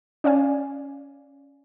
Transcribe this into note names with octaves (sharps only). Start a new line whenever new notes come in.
C#4 D5 F5 G#5